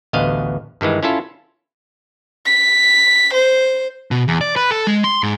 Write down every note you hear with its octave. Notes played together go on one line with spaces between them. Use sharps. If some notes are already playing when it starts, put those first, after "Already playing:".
A1 D2 B3 D#5 F5
G2 D#3 E3 G#3
C#4 E4 F4 A4
B6
C5
B2
E2
D5
B4
A4
G#3
C6
G#2